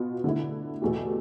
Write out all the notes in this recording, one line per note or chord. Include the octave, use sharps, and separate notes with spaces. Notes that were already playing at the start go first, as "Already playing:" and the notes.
Already playing: B2 B3 F4
D3 A3 E4
E2 B2 A3 E4 G4